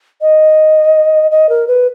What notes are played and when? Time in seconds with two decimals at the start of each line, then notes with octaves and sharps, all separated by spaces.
0.21 D#5
1.31 D#5
1.49 A#4
1.68 B4